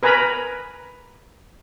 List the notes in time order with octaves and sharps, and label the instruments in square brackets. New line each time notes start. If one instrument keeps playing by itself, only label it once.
[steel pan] A#4 B4 G#5 A#5 B5